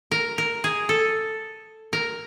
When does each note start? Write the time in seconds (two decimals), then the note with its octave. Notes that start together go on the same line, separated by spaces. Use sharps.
0.11 A#4
0.38 A#4
0.64 G#4
0.89 A4
1.93 A#4